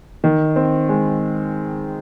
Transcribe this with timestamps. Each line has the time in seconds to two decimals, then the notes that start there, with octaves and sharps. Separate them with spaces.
0.24 D#3
0.56 C4
0.89 G#3